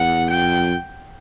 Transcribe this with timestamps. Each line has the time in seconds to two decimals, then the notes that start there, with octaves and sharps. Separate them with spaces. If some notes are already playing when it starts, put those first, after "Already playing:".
Already playing: E2 F#5
0.30 F2 G5